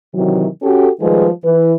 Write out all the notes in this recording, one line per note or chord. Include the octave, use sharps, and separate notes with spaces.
C3 D#3 E3 F#3
C#4 F#4 G4 A4
D#3 F3 G3 G#3 G#4 B4
E3 B4